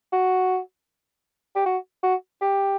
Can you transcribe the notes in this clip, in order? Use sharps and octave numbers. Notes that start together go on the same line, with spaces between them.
F#4
G4
F#4
F#4
G4